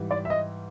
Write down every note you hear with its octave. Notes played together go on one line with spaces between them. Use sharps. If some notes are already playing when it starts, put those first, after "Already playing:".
Already playing: G#2 E3 G3
D5
E5
D#5